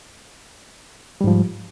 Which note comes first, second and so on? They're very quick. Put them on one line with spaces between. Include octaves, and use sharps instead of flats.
G3 G#2 F3